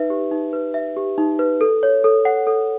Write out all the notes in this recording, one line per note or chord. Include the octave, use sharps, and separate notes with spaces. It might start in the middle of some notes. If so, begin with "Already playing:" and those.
Already playing: D#4 B4 E5
G4
D#4
B4
E5
G4
D#4
B4
A4
C#5
A4
F#5
A4